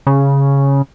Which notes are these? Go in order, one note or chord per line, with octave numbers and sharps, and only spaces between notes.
C#3